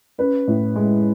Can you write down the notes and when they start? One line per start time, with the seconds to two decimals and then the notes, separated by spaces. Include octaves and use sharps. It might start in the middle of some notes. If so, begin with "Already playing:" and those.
0.18 C#4 B4
0.47 A2
0.76 G#3